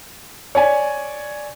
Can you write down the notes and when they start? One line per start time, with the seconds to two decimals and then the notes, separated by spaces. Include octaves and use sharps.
0.55 C#5 D5 G#5